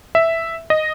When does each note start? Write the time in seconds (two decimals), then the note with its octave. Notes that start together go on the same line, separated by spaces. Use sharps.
0.15 E5
0.70 D#5